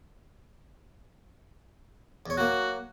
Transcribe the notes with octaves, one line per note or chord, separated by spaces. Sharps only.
E2 C#5
F#3 A#3 F#4